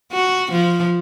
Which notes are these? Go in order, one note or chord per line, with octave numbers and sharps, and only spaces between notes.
F#4
F3